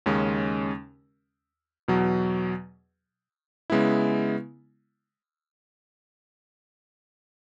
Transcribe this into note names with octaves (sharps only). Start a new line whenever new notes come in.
D#2 C#3 G#3 C#4
E2 B2 F#3
C#3 G#3 B3 E4